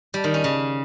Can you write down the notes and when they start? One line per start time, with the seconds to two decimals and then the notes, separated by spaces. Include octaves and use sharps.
0.14 G3
0.24 D#3
0.34 C#4
0.44 C#3